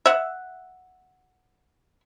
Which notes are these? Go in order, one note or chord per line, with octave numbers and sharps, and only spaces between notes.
E5 F#5